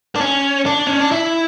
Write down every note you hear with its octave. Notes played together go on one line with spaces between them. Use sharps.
D4
C#4
D4
C#4
D4
E4